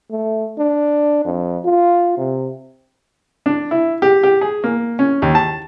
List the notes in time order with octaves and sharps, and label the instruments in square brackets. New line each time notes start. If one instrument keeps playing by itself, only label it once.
[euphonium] A3
D4
F2
F4
C3
[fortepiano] D4
E4
G4
G4
G#4
A#3
C#4
D#2
A5